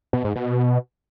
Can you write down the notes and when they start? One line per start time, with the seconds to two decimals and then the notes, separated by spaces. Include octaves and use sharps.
0.13 B2
0.24 G#2
0.36 B2